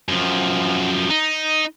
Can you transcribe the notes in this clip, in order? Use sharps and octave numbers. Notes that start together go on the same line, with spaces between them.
F#2 F3
D#4